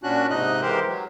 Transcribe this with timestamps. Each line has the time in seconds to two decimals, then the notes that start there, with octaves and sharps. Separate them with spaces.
0.03 A#2 C#4 D4 F#4 F#6
0.30 G#2 C3 D#4 D#5 F#6
0.62 E3 G#3 G4 A#4 C5
0.88 F#3